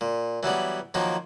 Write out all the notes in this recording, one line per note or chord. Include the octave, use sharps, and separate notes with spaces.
A#2
E3 F#3 G3 B3
D#3 F3 F#3 A#3